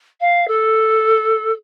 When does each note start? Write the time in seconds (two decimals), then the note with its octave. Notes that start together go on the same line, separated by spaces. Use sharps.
0.20 F5
0.47 A4